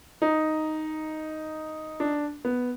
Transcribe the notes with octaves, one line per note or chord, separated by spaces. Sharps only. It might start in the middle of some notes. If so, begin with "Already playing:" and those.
D#4
D4
B3